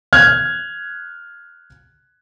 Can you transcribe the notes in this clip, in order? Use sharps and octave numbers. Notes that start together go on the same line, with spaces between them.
F6 F#6 G#6